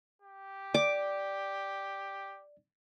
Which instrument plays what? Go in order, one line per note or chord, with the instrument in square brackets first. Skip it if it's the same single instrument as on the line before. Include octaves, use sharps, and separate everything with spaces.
[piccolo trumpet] G4
[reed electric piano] D5 [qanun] D6